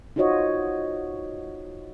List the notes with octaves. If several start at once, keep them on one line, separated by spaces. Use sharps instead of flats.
D#4 F4 F#4 C5 C#5 D#5